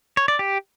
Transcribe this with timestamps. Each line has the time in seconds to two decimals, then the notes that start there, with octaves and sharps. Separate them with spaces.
0.17 C#5
0.28 D5
0.39 G4